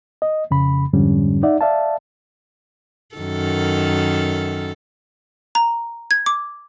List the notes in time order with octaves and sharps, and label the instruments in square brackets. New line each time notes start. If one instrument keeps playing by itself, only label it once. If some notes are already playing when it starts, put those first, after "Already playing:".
[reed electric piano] D#5
F2 C#3 B5
F2 G#2 D3 G3 C#4
D#4 D5 E5 F#5
D5 E5 F5 A5
[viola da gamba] F#2 D#3 A4
[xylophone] A#5
G#6
D6